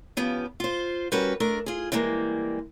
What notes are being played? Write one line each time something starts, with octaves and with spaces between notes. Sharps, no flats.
C#3 F3 B3 G4
F4 C5
G3 C#4 F#4 A#4 B4
A3 D4 A#4
F4 G#4
E3 G3 G#3 A#3